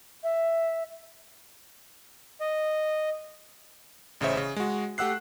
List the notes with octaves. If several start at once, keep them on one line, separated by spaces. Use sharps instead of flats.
E5
D#5
A1 C#3 C5 C#5 E5
C#3
G#3 F#4
A3 G4 F#5 E6 F#6 C7